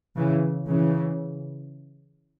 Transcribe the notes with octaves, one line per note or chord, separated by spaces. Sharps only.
C#3 E3
C#3 E3